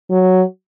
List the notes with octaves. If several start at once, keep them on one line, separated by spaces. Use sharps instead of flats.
F#3